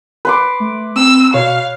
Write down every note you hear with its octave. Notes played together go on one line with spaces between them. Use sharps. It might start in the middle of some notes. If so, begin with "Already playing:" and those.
B4 C6 D6
A3
C4 E6
B2 C#5 F5